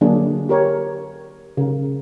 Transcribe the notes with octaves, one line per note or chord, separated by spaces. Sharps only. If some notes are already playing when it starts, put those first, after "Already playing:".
D3 F#3 A#3 D4 G#4
G4 A#4 C#5
C#3 A#4